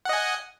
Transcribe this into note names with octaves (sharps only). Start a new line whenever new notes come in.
D#5 F#5 G#5